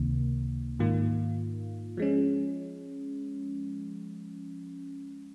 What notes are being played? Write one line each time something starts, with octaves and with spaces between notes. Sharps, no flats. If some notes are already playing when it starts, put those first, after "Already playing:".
Already playing: C#2 C3 D#3 A#3
G#2 D#3 A#3 F4
F3 G#3 C#4